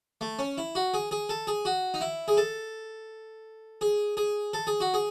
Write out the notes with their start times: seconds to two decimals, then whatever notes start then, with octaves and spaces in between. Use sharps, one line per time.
0.21 A3
0.39 C#4
0.58 E4
0.75 F#4
0.94 G#4
1.11 G#4
1.29 A4
1.47 G#4
1.65 F#4
1.94 D#4
2.01 E4
2.28 G#4
2.37 A4
3.81 G#4
4.17 G#4
4.53 A4
4.67 G#4
4.80 F#4
4.94 G#4